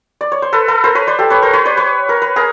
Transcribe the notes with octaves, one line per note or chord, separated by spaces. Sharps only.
D5
C#5
C5
A4 B4
A4 B4
A#4 C5
B4 C#5
C5 D5
G4 A4
B4 C#5
A#4 C5
B4 C#5
C5 D5
B4 C#5
A#4
B4
G#4 A#4